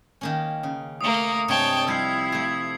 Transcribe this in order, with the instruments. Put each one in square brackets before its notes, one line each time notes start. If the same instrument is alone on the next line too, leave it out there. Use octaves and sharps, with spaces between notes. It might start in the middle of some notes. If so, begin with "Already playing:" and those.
[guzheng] D#3 A#3 C#4
C#3
[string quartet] A3 A#3 A#4 [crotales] D#6 C#7
[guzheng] G2 C3 G#3 [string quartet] C#5 G5 A5
[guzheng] F3 G3 F4 [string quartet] E4 [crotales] E6 G#6 C7
[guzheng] F3 A3 [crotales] G#6